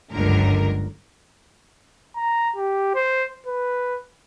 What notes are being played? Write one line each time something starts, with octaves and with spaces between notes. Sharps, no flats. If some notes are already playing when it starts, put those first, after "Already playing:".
G1 C#2 G#2 D3 F#3 A#4
A#5
G4
C5
B4